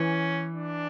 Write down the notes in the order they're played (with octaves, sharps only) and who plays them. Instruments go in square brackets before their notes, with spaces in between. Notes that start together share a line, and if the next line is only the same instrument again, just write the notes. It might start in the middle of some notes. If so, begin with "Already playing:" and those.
Already playing: [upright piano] E3 [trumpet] C#4
[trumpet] D4